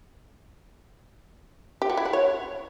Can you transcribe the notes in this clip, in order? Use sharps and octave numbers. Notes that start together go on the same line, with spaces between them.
G4
F#4
E4
F#5
C#5